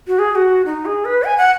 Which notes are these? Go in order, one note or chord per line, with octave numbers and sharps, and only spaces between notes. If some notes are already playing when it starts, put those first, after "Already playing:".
F#4
G#4
G#4
F#4
D#4
G#4
B4
G#5
F#5